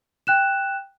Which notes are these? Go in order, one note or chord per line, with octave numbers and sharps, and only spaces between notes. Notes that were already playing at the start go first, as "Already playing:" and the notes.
G5 F#6 E7